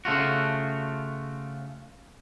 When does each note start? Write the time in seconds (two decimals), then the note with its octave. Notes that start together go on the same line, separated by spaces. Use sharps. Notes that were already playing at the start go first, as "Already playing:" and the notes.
0.05 C#3 A3 F4 F#4